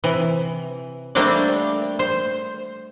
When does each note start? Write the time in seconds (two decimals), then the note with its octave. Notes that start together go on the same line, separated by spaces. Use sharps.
0.04 C3 E3
1.15 G3 A3 A#3 C4 D4 D5
1.99 C5